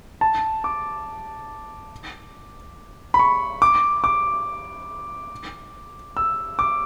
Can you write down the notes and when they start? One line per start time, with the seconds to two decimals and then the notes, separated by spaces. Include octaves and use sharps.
0.21 A5
0.64 D6
3.14 B5
3.19 C#6
3.62 D6
4.04 D6
6.17 E6
6.59 D6